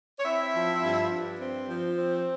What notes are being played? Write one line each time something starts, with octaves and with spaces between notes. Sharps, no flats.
C#5
C4 E4 E5
F3
G2
G2
C4
F3
C4